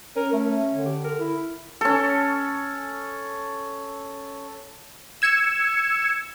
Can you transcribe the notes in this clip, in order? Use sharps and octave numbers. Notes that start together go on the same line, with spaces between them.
C#4 A#4
A3
D3
G4
A#4
E4
C#4 A4
E6 G#6 C#7 E7